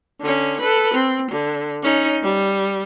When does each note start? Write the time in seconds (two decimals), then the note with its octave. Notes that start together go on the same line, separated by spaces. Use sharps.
0.20 D3 C#4
0.61 A4 B4
0.94 C4
1.31 D3
1.83 C#4 D#4
2.23 G3